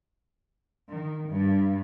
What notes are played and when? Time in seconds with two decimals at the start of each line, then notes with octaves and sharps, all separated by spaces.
0.89 D#3
1.28 G2